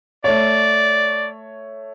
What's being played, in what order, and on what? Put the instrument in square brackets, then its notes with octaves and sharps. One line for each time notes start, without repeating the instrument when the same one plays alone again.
[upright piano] A3 C#5 [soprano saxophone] D5